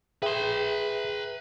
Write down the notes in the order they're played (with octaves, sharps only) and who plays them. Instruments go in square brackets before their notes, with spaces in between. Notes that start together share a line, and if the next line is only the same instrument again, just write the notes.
[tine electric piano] G#4 E5 G5 [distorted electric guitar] B4 C6